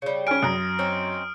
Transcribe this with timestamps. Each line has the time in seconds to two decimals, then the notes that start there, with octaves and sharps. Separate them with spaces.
0.02 C#3 G3
0.27 C#4 G#5 F6 D7
0.42 F#2 A#5 D#6
0.79 C4 C#4 D#4